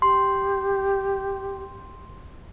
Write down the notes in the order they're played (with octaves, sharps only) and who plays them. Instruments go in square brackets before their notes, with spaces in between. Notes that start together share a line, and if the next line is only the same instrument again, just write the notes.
[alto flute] G4 [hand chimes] C6